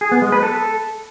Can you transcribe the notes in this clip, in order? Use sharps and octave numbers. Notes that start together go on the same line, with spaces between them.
G#4
B3
G#3
B4
A4